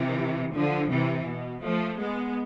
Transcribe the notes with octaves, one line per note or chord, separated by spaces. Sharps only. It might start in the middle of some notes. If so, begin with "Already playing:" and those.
Already playing: C3 E3
D3 F3
C3 E3
B2
F3 A3
G#3 B3